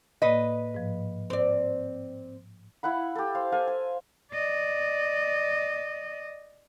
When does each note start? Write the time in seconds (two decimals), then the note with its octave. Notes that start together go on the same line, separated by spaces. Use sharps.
0.22 A2 A#3 B4 D5 D#5
0.74 G#2 F3
1.30 C4 D5
2.83 E4 F5 F#5 B5
3.15 G4 A4
3.35 C5 F5
3.52 A4 E5 F5 G#5
3.67 G#5
4.32 D5 D#5